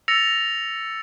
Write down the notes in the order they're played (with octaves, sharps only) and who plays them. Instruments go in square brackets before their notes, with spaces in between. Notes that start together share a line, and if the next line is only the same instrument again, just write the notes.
[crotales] E6 A6 A#6 C#7 F7